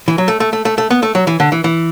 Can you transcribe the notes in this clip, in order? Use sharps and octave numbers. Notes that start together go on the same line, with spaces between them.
E3
F#3
A3
A3
A3
A3
A3
B3
A3
F#3
E3
D3
E3
E3